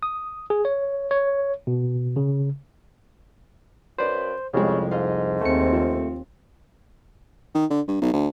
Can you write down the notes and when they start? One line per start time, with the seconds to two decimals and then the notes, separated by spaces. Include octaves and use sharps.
0.03 D#6
0.50 G#4
0.65 C#5
1.11 C#5
1.67 B2
2.16 C#3
3.98 F#2 B4 C5 D5
4.54 C2 F2 C#3 G#3 G4
4.91 G#2 D#5 F5
5.41 D#2 A3 C4 C#7
5.72 F3
7.55 D#3
7.70 D3
7.88 G2
8.02 B1
8.13 D2